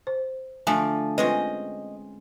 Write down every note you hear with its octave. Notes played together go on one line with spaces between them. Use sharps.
C5
D3 F3 A3 D5 G#5
G#3 C4 C#4 F4 B4 D#5